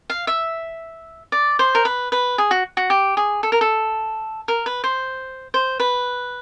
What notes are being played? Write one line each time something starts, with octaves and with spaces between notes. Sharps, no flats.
F5
E5
D5
C5
A#4
B4
B4
G#4
F#4
F#4
G4
G#4
A4
A#4
A4
A#4
B4
C5
C5
B4